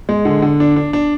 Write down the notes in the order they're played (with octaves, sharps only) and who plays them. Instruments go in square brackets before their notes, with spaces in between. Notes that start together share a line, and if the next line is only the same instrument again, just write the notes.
[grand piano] G#3
D3
D3
D4
D4
D4